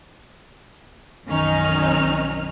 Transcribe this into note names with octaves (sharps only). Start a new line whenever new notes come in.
B1 F#2 D#3 C#4 D#4 F6